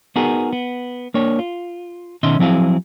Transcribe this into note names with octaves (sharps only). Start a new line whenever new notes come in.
B3 D#4 F#4 G#4 A#4
B3
A#3 D4 C#5
F4
B2 D#3 C#4 D#5 E5 C6
F3 F#3 C4 E4 G#4 F5